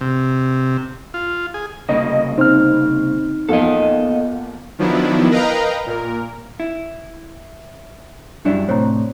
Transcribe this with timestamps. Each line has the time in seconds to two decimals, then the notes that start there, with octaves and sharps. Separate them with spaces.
0.01 C3
1.14 F4
1.54 G#4
1.89 C2 C#3 A#3 D#5
2.38 C4 D#4 F6
3.49 E2 F3 A#3 A4 D#5
4.78 D#3 F3 F#3 B3 D4 E4
5.31 A#4 B4 D#5 F5 G5 A#5
5.86 A#2 A#4
6.60 E4
8.45 G2 F#3 D4 E4 D5 F5
8.68 A2 C3 C5 C#5 A#5